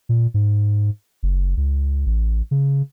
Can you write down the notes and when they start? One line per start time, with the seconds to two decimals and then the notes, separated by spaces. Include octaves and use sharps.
0.09 A#2
0.34 G#2
1.23 F#1
1.57 C#2
2.06 A1
2.51 C#3